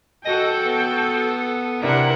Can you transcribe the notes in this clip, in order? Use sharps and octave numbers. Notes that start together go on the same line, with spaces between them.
F#4 A4 D#5 G5
B3
C3 D4 E4 A#4 F#5